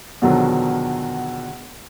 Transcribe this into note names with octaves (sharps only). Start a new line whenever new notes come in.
E2 B2 D3 D#3 F3 F#3